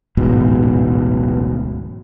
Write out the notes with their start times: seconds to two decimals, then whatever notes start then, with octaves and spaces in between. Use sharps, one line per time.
0.17 D1 A1 G#2 B2